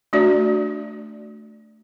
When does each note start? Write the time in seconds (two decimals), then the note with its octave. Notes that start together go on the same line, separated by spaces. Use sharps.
0.13 A3 D4 F#4 D5